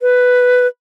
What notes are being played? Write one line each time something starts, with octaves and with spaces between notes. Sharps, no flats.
B4